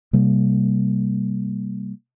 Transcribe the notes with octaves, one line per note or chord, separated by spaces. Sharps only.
C3 G3 A#3